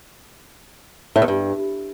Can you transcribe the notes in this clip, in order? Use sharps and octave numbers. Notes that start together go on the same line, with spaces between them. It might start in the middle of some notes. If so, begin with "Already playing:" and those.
A2
E2
G2